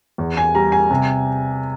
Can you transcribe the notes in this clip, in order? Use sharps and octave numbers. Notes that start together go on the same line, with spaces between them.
E2
G#5
G3 A#5
G#5
C3